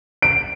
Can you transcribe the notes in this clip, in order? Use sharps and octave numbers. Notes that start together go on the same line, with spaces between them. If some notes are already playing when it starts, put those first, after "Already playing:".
D7